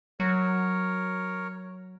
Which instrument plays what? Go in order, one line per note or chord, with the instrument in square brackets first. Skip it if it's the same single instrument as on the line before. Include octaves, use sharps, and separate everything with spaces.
[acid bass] F#3 [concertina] A#4 C#5